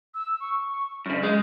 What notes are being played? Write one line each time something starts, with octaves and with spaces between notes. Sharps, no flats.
E6
C#6
F#2 C#3
G#3 G6